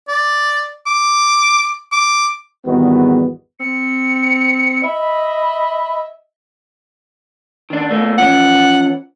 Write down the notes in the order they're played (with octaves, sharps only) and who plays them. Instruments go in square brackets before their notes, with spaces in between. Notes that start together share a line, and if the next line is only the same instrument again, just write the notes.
[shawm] D5
D6
D6
[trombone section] G#1 E2 D#3 G3 B3 F#4
[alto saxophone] C4 [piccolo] C#7
[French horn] D#5 [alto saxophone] E5 [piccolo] B5
[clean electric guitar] D#3 D4
B2 A3 A#3
[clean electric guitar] E3 F3 C#4 [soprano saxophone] F#5